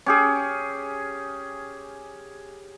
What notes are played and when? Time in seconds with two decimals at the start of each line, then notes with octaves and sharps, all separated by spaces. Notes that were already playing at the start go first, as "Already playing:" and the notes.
0.06 C#4 G4 G#4